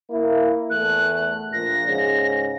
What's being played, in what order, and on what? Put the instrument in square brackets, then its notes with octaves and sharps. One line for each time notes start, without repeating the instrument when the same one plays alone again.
[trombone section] A#3 E4
[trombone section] E2 A3 [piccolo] F#6
[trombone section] A#1 A#2 [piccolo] A#6
[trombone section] G#2 C#3